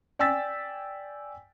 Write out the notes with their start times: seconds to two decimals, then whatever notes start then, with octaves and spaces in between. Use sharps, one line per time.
0.19 D5 G5 G#5 E6 A6 B6